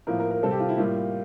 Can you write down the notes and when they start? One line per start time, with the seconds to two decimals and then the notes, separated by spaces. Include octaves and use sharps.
0.07 A2 F3 A#3 A#4
0.19 A#4
0.31 A#4
0.43 C3 G3 C4 A4
0.51 G4
0.60 F4
0.69 E4
0.78 A2 G3 A#3 F4